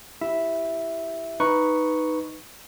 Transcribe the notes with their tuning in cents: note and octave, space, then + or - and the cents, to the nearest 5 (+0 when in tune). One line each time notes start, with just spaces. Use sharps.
E4 +0 G4 +0 E5 +0
D#4 +0 B4 +0 C#6 +0